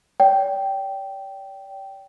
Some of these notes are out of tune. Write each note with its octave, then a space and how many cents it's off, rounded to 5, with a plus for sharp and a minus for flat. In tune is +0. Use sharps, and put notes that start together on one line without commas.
D5 -45 G5 -10